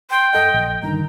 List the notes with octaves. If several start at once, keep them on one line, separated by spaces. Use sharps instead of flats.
G5 C6
F#2 A4 D#5 F#5
A#1
G2 D3 D#3 A#5